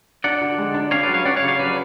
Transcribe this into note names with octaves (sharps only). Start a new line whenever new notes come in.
D4 D5 F#5
D3
G#3
D4
C#4 C#5 F5
B4 D5
F#3
C#5 F5
C#4 D5 F#5
C#5 F5
C#3
C#5 F5
F#3 B4 D5